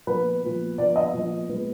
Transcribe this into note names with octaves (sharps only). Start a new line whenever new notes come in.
A#2 F3 B3 B4
A#2 F3 B3
A#2 F3 B3 D5
D#5
A#2 F3 B3
A#2 G#3 B3